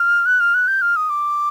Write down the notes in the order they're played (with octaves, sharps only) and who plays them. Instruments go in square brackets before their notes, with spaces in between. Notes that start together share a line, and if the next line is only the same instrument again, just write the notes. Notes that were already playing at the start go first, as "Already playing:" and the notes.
Already playing: [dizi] F6
F#6
F6
F#6
G6
F6
D#6
D6